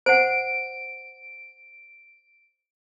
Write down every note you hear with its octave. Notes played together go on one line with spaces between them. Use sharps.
C5 F#5 D7